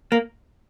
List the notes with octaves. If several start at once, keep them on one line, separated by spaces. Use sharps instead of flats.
A#3